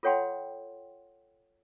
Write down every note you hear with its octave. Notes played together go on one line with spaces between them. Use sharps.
F4 A4 C#5 F#5 G5 C6